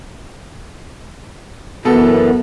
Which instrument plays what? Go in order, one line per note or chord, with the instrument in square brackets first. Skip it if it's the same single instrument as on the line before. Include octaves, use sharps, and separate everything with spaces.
[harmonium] F#2 E3 [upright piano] B2 A4 [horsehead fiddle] B3